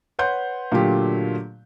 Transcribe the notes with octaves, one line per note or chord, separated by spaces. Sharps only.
B4 C#5 F#5 C6 G6
A#2 D3 F#3 A3 F4 G4